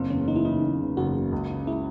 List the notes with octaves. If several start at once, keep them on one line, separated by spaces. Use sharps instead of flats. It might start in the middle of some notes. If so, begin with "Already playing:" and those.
Already playing: F#1 C4
E2 C#4
F#1 D#4
E4
C#3 D#4
F#1
E2
F#1 F#4
C#3
C#2
C#3
G#3 E4